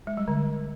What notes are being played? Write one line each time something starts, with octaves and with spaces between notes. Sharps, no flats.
G#3
G3
D3